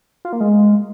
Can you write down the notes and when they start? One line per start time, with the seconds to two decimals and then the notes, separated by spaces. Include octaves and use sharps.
0.25 F4
0.33 A#3
0.41 G#3